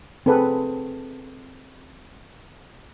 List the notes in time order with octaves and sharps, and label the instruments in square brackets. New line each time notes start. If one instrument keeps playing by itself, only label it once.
[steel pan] C4 G#4 A4 B4